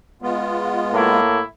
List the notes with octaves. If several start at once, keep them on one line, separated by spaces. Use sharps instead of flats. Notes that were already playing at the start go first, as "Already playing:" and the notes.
G#3 B3 F4
A2 A#3 E4